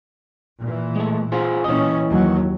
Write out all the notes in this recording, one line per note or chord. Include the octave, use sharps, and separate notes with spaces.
A#2 E3
G#3 A3
F4 G#4 C5
A#2 E3 C#4 D#5
D#2 F#3